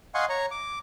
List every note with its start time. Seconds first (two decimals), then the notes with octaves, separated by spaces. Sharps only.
0.14 D#5 F5 F#5 G#5 C6 C#6
0.29 C#5 A#5 C#6
0.51 D6